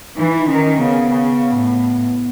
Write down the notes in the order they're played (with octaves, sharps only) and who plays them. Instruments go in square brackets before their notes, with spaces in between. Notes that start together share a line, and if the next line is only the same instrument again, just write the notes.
[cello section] E3 [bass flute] D#4
[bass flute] E4
D#4
[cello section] D#3 [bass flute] C#4
[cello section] C#3 [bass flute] B3
[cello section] C#3
A2